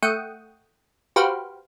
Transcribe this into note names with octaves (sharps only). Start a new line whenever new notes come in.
A3 F#5 G5 C#6 D#6
F#4 G4 B4 C5 F5